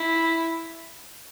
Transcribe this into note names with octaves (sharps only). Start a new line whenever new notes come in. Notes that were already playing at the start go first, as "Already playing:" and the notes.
Already playing: E4